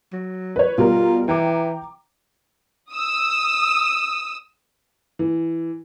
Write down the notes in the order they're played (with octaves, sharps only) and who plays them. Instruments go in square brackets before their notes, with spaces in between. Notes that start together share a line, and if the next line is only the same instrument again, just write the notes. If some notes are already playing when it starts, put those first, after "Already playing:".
[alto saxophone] F#3
[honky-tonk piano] B4 C#5
[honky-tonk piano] B2 G3 A#4 [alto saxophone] F4
[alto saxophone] E3 [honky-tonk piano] G5 A#5 D6
[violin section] D#6 E6
[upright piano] E3